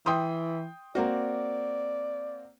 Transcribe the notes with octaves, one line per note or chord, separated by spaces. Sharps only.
E3 G5 C6 D#6
A#3 C4 F#4 D5